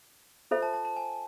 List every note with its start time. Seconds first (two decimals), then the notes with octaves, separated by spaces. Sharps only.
0.51 F4 A4 C5 E5
0.63 A5
0.74 A5
0.85 A5
0.97 G#5